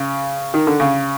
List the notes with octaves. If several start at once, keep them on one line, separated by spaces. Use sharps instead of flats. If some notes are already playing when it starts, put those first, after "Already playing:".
Already playing: C#3
D#3
D3
C#3